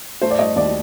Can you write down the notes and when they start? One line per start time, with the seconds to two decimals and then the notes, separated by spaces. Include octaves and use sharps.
0.22 A3 C5
0.31 D5
0.39 A3 D#5
0.56 D#2 D5